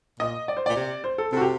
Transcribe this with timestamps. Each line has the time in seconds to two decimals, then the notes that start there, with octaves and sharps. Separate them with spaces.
0.20 A#2 D#5
0.48 D5
0.57 C5
0.66 A#2 D5
0.76 C3
1.04 C5
1.18 A4
1.32 C3 A4
1.37 F#4
1.41 G4